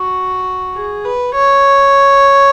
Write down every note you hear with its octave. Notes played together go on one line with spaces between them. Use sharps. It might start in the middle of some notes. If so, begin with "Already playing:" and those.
Already playing: F#4
G#4
B4
C#5